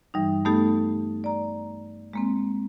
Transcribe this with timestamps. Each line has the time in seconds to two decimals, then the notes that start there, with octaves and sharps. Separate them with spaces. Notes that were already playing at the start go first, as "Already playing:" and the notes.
0.14 G2 E3 G3 D#4
0.45 A3 B3 D#4 G4 A4
1.24 D5 A#5
2.13 G#3 A#3 C4